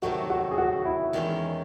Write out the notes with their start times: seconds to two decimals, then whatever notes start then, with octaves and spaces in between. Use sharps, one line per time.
0.02 C3 D#3 F#3 A3 C4 F#4
0.30 F#4
0.51 G#4
0.58 F#4
0.85 E4
1.13 E2 D#3 G#3 C#4